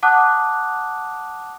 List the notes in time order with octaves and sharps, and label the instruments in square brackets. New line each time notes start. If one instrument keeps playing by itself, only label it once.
[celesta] F#5 A5 D6 D#6 F#6